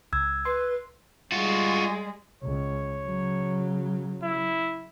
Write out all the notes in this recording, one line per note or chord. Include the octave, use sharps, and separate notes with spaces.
C#2 E6 G#6
B4 C6
G3 G#3 F4 F#4
C#2 C#5
C#3 F#3
E4